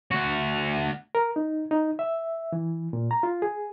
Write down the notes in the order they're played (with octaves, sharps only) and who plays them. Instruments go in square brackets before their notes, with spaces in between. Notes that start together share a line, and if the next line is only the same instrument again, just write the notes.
[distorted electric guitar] D2 F#4
[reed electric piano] A#4
D#4
D#4
E5
E3
A#2
A#5
F4
G#4